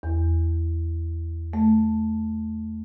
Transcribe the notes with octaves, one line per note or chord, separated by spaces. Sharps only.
E2
A3